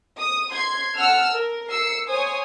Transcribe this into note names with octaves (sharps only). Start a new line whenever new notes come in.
D#6
C6 G#6
F#5 A5 E6 F6
A#4
E6 C7 C#7
C5 C#5 G#5 D#6